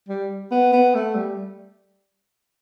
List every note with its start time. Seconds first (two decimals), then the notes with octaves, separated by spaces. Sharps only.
0.09 G3
0.51 B3
0.73 B3
0.95 A3
1.16 G3